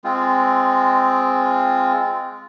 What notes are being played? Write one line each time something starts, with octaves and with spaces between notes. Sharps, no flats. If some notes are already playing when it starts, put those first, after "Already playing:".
G#3 C4 F4